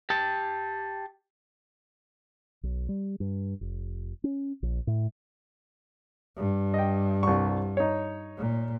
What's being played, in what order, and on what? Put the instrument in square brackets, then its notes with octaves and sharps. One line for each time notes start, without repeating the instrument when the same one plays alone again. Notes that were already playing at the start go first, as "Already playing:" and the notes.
[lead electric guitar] G4 A5
[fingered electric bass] B1
G3
G2
F1
C#4
A#1
A2
[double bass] G2
[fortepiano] D#5 G5
C2 C#6
D#4 C#5
[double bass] A#2